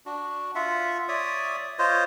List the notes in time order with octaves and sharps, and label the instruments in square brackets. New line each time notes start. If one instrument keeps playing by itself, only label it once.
[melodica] D4 F#4
F4 E5 F#5
C#5 D5 E5 D#6
F4 C5 C#5 D#5